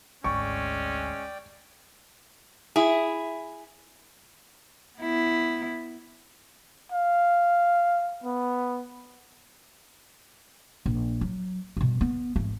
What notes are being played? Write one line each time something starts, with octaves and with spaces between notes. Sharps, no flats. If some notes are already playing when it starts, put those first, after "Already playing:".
G#1 D2 G#3 C#4 D5 G5 C#6
E4 G#4
B3 E4
F5
B3
A#1
F#3
G2 B2
B3
G#1 E3